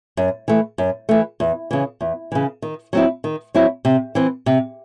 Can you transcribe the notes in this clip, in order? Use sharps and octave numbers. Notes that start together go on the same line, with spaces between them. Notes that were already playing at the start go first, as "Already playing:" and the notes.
F#2
E3 A3
F#2
E3 A3
E2
C#3 E3
E2
C#3 E3
D#3
F#3 C4 E4
D#3
F#3 C4 E4
C3
E3 C4
C3